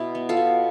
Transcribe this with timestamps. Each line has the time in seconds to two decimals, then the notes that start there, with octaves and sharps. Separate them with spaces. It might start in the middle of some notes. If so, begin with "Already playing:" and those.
Already playing: B2 E4
0.15 B3
0.29 F4 A4
0.37 B2